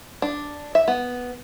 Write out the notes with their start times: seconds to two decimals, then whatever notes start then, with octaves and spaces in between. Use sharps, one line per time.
0.22 D4
0.75 E5
0.88 B3